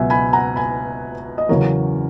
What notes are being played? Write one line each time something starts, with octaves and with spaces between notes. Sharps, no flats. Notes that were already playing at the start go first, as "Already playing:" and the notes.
Already playing: C#2 B2 F#3 B3 E5 G#5
G#5 B5
F#5 A#5
G#5 B5
D#5
E2 C#3 F#3 A#4 C#5